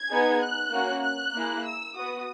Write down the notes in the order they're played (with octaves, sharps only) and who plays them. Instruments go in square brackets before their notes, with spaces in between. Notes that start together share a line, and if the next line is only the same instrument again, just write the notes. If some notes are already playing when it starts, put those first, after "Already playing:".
Already playing: [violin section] G#6
B3 D#4 G#4
F#6
A#3 C#4 F#4
F#6
A#3 E4 G#4
E6
B3 F#4 D#6